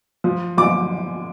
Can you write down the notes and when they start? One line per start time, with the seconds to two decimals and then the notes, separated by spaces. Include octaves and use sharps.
0.24 F3
0.57 F3 D6